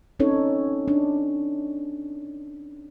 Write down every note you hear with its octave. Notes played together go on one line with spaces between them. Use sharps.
C4 C#4 D#4 A4 C#5
D4